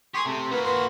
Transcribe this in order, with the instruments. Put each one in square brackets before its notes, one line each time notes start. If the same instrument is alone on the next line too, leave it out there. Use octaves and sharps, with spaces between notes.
[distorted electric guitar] G4 G#4 [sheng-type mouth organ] C6 C#6 D#6
[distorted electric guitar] C3 [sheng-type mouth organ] A3
[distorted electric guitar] A#3 F#4 [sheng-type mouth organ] B4
[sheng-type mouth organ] B4 C6